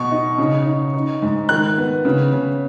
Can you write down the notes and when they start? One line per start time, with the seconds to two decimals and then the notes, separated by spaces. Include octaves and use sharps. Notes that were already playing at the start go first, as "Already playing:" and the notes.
Already playing: B2 C#6
0.11 D#4
0.38 C#3
0.67 D#4
0.93 D#4
1.22 G#2
1.49 D#3 F#6
1.78 B3
2.05 C#3
2.33 C#3